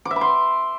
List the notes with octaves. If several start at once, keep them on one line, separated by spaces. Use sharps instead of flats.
D6
E5
B5
C6